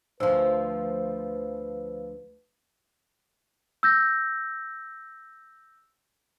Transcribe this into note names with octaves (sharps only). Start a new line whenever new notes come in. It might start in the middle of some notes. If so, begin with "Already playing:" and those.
D2 F3 B4 C5 E6
E6 G6 A#6